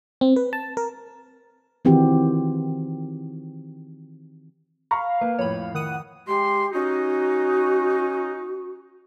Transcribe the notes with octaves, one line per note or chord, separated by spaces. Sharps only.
C4
B4
A5
A#4
D#3 E3 C4 F#4 G4
F5 A#5 B5 C#6
A#3 B4
F2 A2 C#5 B5
D#3 F#5 D#6 D#7
G#3 G4 C6
C#4 D#4 F#4